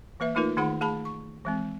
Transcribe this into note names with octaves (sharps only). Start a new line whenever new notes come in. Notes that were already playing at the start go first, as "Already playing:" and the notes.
E3 A#3 B4 E5
A3 A#3 D#4 F4 A#4 B4
D#3 A3 D#4 G#4 F#5 B5
A3 G#4 A5 B5
C#6
E3 G#3 C4